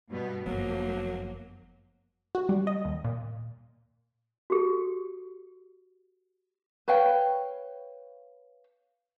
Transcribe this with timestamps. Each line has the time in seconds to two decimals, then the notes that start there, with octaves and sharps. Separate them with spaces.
0.10 G2 B2 B3
0.46 G1 F#2 F3 F#3 A#3
2.35 F#4
2.49 G3
2.67 D#5
2.85 D#2
3.04 A#2
4.50 F#4 G4 A4
6.88 B4 C#5 F5 G5